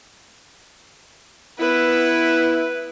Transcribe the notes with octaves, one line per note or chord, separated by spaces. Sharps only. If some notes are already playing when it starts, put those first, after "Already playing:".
B3 E4 B4